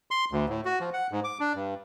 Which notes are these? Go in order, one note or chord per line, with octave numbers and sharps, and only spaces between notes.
C6
D2
A2
F#4
F3
F#5
G#2
D6
D4
G2